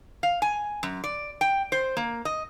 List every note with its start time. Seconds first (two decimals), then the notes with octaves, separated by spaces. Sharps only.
0.23 F5
0.42 G#5
0.83 F#2
1.04 D5
1.41 G5
1.72 C5
1.97 A#3
2.25 D#5